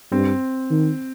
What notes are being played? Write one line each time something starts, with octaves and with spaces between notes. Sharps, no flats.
G2 C4
D#3